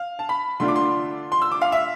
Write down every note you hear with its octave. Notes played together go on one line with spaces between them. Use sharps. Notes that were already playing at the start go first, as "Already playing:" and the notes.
Already playing: F5
A5
B5
D3 A3 D4 F4 C6
D6
C6
C6
E6
D6
F5
E5